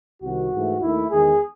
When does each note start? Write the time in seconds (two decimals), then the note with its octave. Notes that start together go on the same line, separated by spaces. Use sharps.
0.22 C2 C3 D#3 F#4
0.52 G#2 E3 A3
0.82 D#2 D#3 A3 E4
1.11 E2 D#3 G#3 G#4